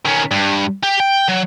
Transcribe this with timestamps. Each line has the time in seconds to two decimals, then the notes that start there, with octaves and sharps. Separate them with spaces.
0.05 D#3 C#4
0.31 G2
0.83 G4
1.00 G5
1.28 F#3